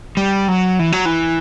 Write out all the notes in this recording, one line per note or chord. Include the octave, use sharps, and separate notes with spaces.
G3
F#3
E3
F#3
E3